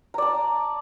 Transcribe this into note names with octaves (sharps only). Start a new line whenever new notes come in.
D5 A5 A#5